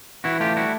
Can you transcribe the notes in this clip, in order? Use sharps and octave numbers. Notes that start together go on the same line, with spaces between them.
E3 E4 F#4
A3 F4 G4
G3 E4 F#4